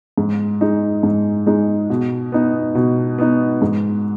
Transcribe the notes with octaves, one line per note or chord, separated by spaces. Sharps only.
G#2
G#3 D#4
G#2
G#3 D#4
B2
B3 D#4
B2
B3 D#4
G#2